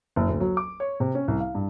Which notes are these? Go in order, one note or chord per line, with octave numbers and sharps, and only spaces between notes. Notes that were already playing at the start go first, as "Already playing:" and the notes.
F#1
D2
F#3
D6
C#5
C3
C#4
C2
F5
G2